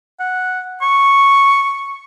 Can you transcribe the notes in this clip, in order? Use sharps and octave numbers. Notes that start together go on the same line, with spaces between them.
F#5
C#6